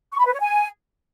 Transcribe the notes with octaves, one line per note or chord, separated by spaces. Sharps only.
C#6
B5
B4
C#5
G#5